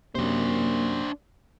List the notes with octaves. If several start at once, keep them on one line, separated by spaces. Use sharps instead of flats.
F#2 C3 A#3 D4 C5